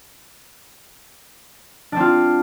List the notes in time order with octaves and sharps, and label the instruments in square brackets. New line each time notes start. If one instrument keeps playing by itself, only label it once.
[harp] D4
C4
F4